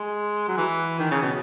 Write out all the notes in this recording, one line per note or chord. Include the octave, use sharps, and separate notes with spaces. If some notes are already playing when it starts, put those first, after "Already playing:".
Already playing: G#3
F#3
E3
D#3
C#3
B2